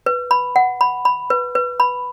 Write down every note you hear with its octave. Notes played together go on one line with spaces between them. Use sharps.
B4
B5
F#5
B5
B5
B4
B4
B5